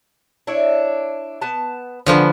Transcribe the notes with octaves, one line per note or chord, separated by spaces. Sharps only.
D4 E4 C#5
B3 A5
D3 F3 B3 G#5